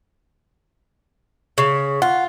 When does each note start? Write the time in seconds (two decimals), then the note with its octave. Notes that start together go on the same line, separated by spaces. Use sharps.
1.58 C#3
2.02 F4 F#5